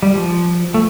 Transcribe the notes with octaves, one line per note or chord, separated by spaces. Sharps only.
G3
F3
A3